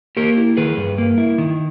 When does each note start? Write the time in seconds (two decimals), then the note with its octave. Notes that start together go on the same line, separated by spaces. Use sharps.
0.17 A#3 G4 A#4
0.37 E4
0.57 D#3 G#4 B4
0.77 G2
0.98 A#3
1.18 E4
1.38 D#3